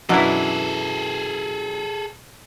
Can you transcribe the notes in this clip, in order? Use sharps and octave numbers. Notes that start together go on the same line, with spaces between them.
F#2 B2 E3 F#3 D4 E4 G#4 A4